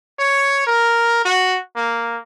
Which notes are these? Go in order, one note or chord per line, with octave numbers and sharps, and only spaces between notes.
C#5
A#4
F#4
A#3